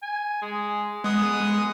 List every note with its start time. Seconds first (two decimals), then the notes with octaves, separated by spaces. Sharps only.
0.03 G#5
0.42 G#3
1.04 G#3 B3 D#6